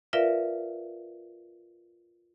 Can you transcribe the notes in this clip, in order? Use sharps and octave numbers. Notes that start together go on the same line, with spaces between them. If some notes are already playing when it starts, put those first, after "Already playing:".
F4 A#4 B4 D5 E5 F5